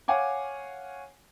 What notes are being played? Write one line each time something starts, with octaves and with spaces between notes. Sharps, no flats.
C#5 F5 F#5 G#5 D6